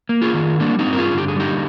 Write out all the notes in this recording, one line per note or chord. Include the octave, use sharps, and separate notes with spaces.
A#3
F4 G#4
D#3
G3 A#3 D4
C4 D#4
G2
A#4
F4 G#4
D3
G4
G#4
G3 D#4 G4